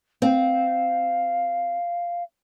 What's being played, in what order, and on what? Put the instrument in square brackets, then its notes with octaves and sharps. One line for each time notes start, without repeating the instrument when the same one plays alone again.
[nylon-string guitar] C4 [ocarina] F5